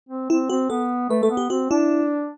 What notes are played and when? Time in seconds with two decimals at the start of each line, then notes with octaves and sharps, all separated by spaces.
0.09 C4
0.30 C4 E4
0.50 C4 F#4
0.70 B3 A4
1.09 A3 B4
1.23 A3 A4
1.30 B3
1.37 G4
1.50 C4 F#4
1.70 D4 E4